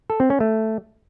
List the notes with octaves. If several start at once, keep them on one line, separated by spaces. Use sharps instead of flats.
A4
C4
C#4
A3